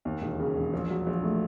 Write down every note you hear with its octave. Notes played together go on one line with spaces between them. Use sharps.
D#2
E1
C#3
E1
A#1
F#3
A#1
A3